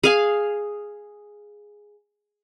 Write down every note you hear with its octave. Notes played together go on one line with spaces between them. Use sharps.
G#4 F5 G#5